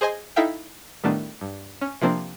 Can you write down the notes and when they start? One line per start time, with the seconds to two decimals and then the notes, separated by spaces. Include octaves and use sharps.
0.01 G#4 C5 D#5 G#5
0.36 D#4 E4 A4 E5 F5 G5
1.03 A2 D#3 G3 A3 B3 D4
1.41 G2
1.81 C#4
2.02 C3 F3 A#3 C4 D4